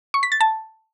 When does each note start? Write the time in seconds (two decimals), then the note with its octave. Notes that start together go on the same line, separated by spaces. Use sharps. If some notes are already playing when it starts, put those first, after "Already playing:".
0.14 C#6
0.23 B6
0.32 A6
0.41 A5